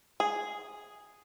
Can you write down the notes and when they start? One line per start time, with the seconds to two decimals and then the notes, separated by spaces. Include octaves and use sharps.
0.20 G#4